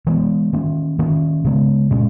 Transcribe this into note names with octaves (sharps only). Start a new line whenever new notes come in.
E3 G#3 B3
D#3 A#3 C#4
D#3 A#3 C#4
C#3 G#3 B3
A#2 G#3 C#4